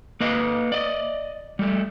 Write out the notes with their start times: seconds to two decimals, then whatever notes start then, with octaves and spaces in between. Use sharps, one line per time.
0.20 A#3 B4 D#5 F5
0.72 D5 D#5
1.59 G3 A3